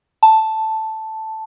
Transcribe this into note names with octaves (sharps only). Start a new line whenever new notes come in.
A5